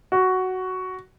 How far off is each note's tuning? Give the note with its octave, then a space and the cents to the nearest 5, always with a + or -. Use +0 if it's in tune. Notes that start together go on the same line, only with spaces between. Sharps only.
F#4 +5